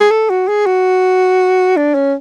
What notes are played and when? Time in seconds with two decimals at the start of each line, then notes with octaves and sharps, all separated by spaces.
0.01 G#4
0.11 A4
0.30 F#4
0.48 G#4
0.66 F#4
1.77 D4
1.95 C#4